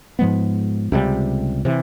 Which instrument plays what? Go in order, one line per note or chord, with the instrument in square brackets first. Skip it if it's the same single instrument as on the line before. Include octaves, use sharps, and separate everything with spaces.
[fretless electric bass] G#2 F3 G#3 B3
C#2 C3 E3 G3
C3 E3